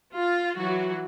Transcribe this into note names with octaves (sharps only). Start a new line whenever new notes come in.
F4
E3 F#3 F#4